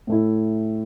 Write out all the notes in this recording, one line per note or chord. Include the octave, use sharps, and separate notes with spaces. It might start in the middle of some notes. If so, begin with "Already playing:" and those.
A2 A3 E4